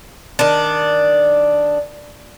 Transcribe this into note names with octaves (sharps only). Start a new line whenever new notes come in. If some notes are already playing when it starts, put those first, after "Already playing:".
D#3 D4